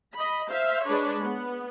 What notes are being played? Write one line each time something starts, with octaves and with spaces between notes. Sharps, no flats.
D#5 B5
C5 E5 F5
G#3 D4 B4 C#5
B3